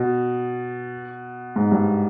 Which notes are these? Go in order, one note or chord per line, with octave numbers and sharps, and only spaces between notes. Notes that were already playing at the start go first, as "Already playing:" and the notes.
Already playing: B2
G#2
G2